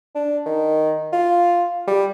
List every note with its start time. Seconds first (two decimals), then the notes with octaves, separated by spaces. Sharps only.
0.15 D4
0.46 D#3
1.13 F4
1.87 G3